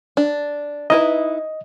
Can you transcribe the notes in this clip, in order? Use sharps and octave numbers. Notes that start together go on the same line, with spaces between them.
D4
D#4 E4 B4 D#5